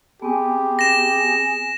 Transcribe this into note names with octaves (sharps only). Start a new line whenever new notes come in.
B3 C4 G4 G#4
A#6 E7